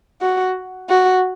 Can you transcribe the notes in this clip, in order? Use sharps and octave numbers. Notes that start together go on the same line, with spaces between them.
F#4
F#4